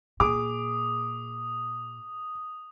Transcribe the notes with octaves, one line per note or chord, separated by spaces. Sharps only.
A#2 G#4 D6 D#6